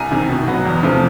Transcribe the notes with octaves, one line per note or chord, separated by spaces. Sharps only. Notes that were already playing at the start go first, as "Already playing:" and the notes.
Already playing: C2 G#5 A#5
C3 D#3
B2
F#3 B3
E2
C3 F3 A3 C4